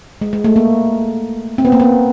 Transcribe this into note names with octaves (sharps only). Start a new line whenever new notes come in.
G#3
G#3
A3
A#3
C4
B3
A#3
B3